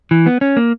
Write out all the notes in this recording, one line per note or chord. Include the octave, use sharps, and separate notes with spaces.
E3
B3
C#4
A#3